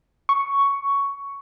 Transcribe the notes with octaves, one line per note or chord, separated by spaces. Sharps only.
C#6